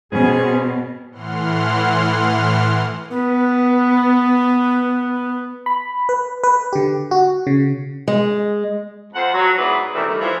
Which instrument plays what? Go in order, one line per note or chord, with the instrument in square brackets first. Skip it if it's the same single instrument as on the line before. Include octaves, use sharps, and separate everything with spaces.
[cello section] B2 [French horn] C4 [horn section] C#4 G#4
[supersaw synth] A2 E3 F#5 C6 F6
[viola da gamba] B3 [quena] B4
[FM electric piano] B5
B4
B4
D3 G4
F#4
C#3
[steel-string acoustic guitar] G#3
[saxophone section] F2 C5 F#5
F#3
G#2 B3 E4 G#4 B4 D5
F#2 C3 D#3 E3 A3 D4
D#3 G3 A3
E3 F3